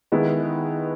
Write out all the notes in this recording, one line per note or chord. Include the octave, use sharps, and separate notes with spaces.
D#3 G#3 B3 E4